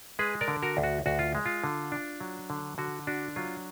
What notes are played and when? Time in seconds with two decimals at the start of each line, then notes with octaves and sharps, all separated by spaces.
0.19 G#3 G#4 B4
0.41 A#4 D5
0.48 D3
0.62 F#4 A#4
0.77 D2
0.83 F#4
1.06 D2 F#4
1.19 F4
1.35 G#3
1.46 F4
1.64 D3
1.92 D4
2.21 F#3
2.50 D3
2.78 D3 F#4
3.07 D4 F#4
3.36 F#3 F4